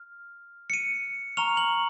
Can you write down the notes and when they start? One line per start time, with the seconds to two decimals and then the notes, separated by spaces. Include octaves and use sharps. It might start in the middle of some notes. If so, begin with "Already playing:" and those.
Already playing: F6
0.70 C#7
0.73 D#7
1.37 A#5 C#6 F6 F7
1.57 F#7